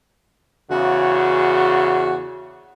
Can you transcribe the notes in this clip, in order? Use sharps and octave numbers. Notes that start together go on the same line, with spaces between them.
E2 C#3 F#4